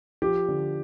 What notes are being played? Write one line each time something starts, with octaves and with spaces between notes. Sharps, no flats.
F3 G4
D3